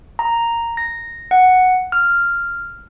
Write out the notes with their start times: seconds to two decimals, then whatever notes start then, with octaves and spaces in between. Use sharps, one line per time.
0.19 A#5
0.77 A#6
1.31 F#5
1.92 F6